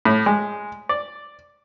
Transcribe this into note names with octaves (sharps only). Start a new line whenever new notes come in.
A2
G#3
D5